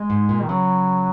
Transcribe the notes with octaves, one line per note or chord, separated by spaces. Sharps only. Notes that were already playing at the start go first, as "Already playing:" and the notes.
Already playing: G#3
G#2
A#2
D#3
C#3 F#3